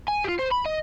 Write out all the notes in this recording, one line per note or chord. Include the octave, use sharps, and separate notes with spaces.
G#5
F4 G4
C5
B5
D#5